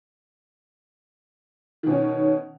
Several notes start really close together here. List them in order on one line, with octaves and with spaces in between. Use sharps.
D#3 B2 C#4